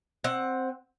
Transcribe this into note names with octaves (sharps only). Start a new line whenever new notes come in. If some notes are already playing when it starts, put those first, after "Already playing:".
C4 F#5